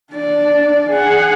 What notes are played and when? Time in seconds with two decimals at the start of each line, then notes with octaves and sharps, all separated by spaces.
0.13 D4 D5
0.90 G#4 F#5